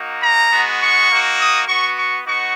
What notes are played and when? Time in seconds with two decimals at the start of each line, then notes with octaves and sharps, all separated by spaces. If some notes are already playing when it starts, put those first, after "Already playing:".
Already playing: A#3 D#4 F#4
0.21 A#5
0.50 G#3 B3 F#4
0.79 C#6
1.08 A#3 D#4 F#4
1.38 D#6
1.67 B3 F#4 C#6
1.96 C#6
2.25 B3 D#4 F#4 C#6